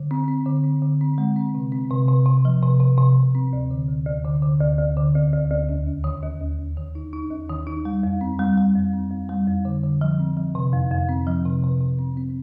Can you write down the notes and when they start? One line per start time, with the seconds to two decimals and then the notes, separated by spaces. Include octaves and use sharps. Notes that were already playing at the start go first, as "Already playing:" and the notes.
Already playing: D3
0.11 C4
0.28 C4
0.46 D3
0.64 C4
0.82 D3
1.01 C4
1.18 G#3
1.36 C4
1.55 C3
1.72 C4
1.91 C3
2.08 C3
2.26 C3
2.45 F3
2.62 C3
2.80 C3
2.98 C3
3.16 C3
3.35 C4
3.53 D2
3.71 D3
3.88 D2
4.07 D2
4.25 D3
4.43 D3
4.60 D2
4.78 D2
4.97 D3
5.15 D2
5.33 D2
5.50 D2
5.69 D#2
5.86 D#2
6.04 D#3
6.23 D#2
6.41 D#2
6.59 D#2
6.77 D#3
6.95 D#4
7.13 D#4
7.30 D#2
7.49 D#3
7.67 D#4
7.85 G3
8.03 F2
8.21 C4
8.39 G3
8.57 G3
8.75 F2
8.93 C4
9.11 F2
9.29 G3
9.47 F2
9.65 D3
9.83 D3
10.01 F3
10.20 C4
10.37 F3
10.55 C3
10.73 F2
10.91 F2
11.09 C4
11.27 F3
11.46 C3
11.64 C3
11.81 C3
11.99 C4
12.17 C4